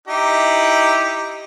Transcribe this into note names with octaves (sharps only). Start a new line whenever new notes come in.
D#4 E4 G4